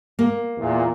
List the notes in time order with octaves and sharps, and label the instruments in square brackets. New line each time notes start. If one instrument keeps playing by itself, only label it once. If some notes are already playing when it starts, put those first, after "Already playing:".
[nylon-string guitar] A#3
[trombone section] E2 A#2